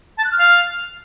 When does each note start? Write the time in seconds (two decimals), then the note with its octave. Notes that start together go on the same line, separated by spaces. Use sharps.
0.17 A5
0.24 F#6
0.31 F6
0.39 F5